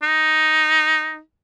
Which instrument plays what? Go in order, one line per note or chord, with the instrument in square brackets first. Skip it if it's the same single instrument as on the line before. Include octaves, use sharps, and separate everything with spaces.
[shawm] D#4